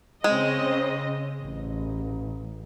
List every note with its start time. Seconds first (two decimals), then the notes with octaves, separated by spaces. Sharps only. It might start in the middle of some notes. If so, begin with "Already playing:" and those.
0.24 C#3 G#3 C4 D#5
1.40 A1